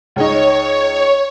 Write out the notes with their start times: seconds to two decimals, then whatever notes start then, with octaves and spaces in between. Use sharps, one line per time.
0.16 C#2 D#4 C#5